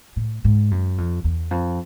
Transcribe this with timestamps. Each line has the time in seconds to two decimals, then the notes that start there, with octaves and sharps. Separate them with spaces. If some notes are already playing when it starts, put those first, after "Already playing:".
0.16 A2
0.44 G#2
0.71 F#2
0.98 F2
1.24 E2
1.51 F2